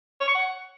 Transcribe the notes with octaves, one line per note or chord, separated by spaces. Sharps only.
C#5
C#6
F#5